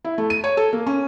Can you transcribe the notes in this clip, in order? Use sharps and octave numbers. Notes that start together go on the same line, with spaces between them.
E4
A3
D#7
C#5
A4
A#3
C#4